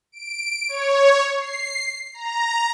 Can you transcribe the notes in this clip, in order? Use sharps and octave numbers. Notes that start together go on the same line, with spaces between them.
D7
C#5
C7
A#5